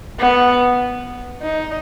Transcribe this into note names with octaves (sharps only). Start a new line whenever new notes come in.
B3
D#4